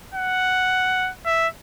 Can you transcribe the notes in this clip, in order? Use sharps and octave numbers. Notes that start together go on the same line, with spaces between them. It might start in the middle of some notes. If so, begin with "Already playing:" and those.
F#5
E5